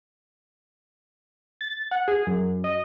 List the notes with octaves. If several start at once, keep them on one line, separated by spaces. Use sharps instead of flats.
A6
F#5
G#4
F#2
D#5